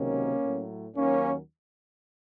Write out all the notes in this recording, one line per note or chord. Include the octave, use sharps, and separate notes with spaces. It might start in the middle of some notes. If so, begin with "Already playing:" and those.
Already playing: C#2 C3 D#3 F#3 A#3 C#4
A2 F#3
D#2 D#3 F#3 A#3 C#4